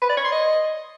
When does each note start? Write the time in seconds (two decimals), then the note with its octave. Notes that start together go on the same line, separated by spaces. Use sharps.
0.02 B4
0.09 D5
0.17 C#5
0.25 C6
0.32 D#5